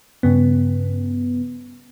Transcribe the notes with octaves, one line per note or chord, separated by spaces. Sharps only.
G2 C#3 B3